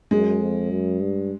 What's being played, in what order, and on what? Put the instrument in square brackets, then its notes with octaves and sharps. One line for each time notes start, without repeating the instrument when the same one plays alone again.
[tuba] F#2 [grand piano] G#3
[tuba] F2
F#2
G2